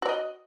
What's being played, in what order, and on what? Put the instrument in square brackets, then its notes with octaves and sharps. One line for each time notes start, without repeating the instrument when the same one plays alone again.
[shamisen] F#4
D5
D#5